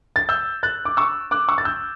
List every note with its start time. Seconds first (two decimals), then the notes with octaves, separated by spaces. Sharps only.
0.16 A6
0.29 E6 G6
0.63 F#6 A6
0.85 D6
0.97 C#6 E6
1.31 D6 F#6
1.49 C#6 E6
1.58 A6
1.65 E6 G6